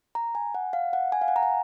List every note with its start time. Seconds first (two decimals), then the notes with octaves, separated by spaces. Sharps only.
0.15 A#5
0.35 G#5
0.54 F#5
0.73 F5
0.93 F#5
1.12 G#5
1.21 F5
1.28 F#5
1.36 A#5
1.43 G#5